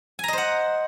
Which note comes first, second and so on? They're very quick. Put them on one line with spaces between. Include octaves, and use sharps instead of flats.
G#5 A#5 D#5 C5 F#5